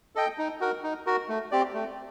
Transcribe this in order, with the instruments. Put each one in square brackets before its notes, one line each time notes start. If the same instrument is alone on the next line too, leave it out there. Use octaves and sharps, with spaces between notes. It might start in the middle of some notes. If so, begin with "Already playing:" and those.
[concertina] A4 D#5 G5
D#4
F#4 A#4
D#4
F#4 A#4
A3
C4 G4 D5
A3